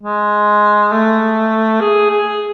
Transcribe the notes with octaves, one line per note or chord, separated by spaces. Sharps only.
G#3
A3
G#4
G#4